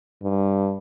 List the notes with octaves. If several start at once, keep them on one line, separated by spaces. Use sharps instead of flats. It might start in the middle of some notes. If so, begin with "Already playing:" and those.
G2